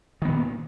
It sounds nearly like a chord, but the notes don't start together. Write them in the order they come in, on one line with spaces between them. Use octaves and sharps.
D#3 B3 A#2